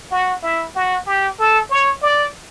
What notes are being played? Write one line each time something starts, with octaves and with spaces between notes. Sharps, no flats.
F#4
E4
F#4
G4
A4
C#5
D5